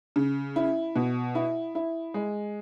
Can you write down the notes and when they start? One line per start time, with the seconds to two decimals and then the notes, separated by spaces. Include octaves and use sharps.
0.16 C#3
0.56 E4
0.96 B2
1.35 E4
1.75 E4
2.14 G#3